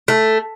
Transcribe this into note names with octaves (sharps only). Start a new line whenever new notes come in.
A3